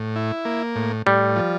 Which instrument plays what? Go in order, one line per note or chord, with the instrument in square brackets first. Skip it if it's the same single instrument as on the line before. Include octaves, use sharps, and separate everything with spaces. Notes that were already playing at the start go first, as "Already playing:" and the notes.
Already playing: [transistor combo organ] A2
E4
A#3
A2
[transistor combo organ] A2 [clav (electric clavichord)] G3
[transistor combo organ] F3